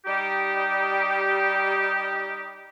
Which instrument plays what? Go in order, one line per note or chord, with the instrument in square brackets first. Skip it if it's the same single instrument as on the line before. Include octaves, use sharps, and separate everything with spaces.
[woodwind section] G3 D#4 G4